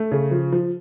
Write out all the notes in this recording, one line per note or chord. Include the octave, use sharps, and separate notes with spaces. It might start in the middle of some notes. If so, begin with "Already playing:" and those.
Already playing: A3
C#3
F3
F3